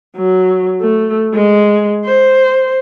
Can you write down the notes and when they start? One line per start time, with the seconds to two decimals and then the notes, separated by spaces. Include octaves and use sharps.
0.17 F#3
0.81 A3
1.34 G#3
2.05 C5